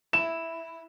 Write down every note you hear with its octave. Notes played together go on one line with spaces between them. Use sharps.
E4 E7